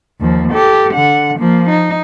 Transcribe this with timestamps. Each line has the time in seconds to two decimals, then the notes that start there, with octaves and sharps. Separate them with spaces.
0.20 D#2 F3
0.52 G4 A4
0.94 D3 F#5
1.38 F3 A#3
1.70 D#4